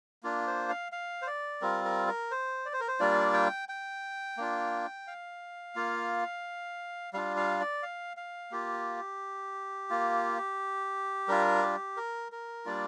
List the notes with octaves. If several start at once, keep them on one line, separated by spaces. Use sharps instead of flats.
A#3 D4 F4
C5
F5
F5
C5
D5
G3 C4 F4 A#4
A#4
A#4
C5
D5
C5
A#4
C5
G3 A#3 D4 F4 D5
G5
G5
A#3 D4 F4
F5
A#3 F4
G3 D4 F4 F5
F5
D5
F5
F5
A#3 F4 G4
A#3 F4
G3 D4 F4 A#4
G4
A#4
A#4
G3 A#3 D4 F4 D5